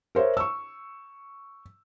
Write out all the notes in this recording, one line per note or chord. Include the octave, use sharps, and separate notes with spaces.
A#4 C5 C#5 E5
C#6 E6